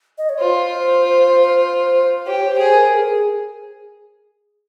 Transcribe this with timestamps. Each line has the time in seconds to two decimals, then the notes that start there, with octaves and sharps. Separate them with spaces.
0.18 D#5
0.29 C#5
0.40 F4 C5
2.27 G4 C#5
2.50 C5
2.58 G#4
2.74 A#4
2.97 G#4